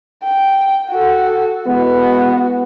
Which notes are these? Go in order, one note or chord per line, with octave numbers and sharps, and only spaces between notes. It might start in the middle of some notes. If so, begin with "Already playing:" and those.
G5
F#4 A4
E3 G#3 B3 F#4